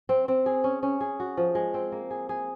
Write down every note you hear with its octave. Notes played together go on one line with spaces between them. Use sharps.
C4
C4
G#4
C#4
C#4
G#4
F#4
F3
G#3
C4
A#3
G#4
G#4